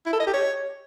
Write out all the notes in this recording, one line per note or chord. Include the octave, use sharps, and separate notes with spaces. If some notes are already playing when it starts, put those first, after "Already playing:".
E4
A4
D#5
G4
C#5